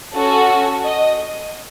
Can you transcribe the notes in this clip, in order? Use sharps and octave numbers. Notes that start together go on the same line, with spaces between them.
C#4 F#4 A4
D#5